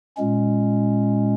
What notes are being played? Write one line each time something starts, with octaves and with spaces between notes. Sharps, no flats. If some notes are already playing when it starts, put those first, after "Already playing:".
A#2 G#3 C#4